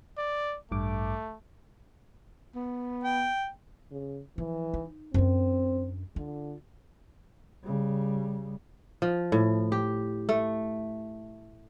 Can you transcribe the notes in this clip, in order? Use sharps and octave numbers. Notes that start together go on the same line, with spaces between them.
D5
A1 G2 A3 D6
B3
G5
C#3
E3 F3
D#4
F#2 C4 D4
D3 F4
C#3 G3
F3
A2
G4
A3